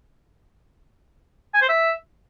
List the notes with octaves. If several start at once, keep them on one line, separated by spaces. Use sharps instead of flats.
G#5
C5
E5